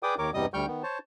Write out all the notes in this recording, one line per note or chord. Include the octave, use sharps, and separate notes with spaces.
G#4 B4 D5 G5 D6 D#6
D#2 D#3 A#4 C#5 D6
E2 G2 C3 G3 D#5 D#6
D2 G3 G5 C#6 F6 G6
D#3 B3
C5 C#5 A5